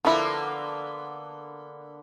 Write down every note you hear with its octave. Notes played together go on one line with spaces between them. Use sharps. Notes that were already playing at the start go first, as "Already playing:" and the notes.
D3 F3 A#3 B3 E4